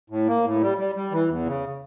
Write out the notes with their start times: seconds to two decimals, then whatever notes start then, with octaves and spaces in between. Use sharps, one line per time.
0.10 A2
0.28 A#3
0.44 A2
0.61 G3
0.78 G3
0.95 G3
1.12 E3
1.28 E2
1.46 C#3